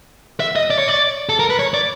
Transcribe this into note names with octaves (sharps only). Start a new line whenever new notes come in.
E5
D#5
D5
C#5
D5
A4
A#4
B4
C#5
D5